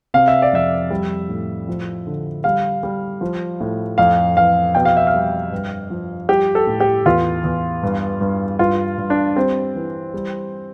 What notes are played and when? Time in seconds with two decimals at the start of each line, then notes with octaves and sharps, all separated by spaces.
0.14 C3 F5
0.28 E5
0.42 D5
0.53 F2 E5
0.90 G3
1.29 A2
1.68 F3
2.07 D3
2.44 G3 F5
2.83 G3
3.21 F3
3.60 A2
3.98 F2 F5
4.36 E3 F5
4.75 B2 G5
4.85 F5
4.97 E5
5.07 F5
5.14 G3
5.52 G2
5.90 F3
6.29 G3 G4
6.55 A4
6.67 A2
6.80 G4
7.06 E2 F4
7.44 E2
7.83 G2
8.21 G2
8.59 G2 F4
8.98 G2
9.10 D4
9.36 G3 C4
9.75 E3
10.14 G3